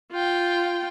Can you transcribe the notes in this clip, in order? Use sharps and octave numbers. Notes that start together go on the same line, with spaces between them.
F4 G5